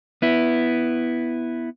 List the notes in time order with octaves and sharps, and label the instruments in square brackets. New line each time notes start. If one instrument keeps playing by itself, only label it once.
[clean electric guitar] B3 E4